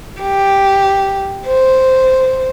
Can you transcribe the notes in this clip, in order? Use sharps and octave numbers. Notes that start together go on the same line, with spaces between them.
G4
C5